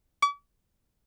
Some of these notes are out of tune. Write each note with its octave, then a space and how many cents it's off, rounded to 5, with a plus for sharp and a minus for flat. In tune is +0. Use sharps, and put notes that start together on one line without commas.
D6 -45